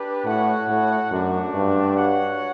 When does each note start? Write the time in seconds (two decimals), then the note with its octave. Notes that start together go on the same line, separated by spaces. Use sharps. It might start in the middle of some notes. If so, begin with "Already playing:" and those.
Already playing: D4 G4 B4
0.25 A2 F#4 C#5 F#5
0.68 A2
1.11 F#2 A3 D4 F#4
1.55 G2
1.97 F#4 C#5 F#5